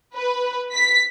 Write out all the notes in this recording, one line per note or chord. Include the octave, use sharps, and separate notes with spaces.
B4
B6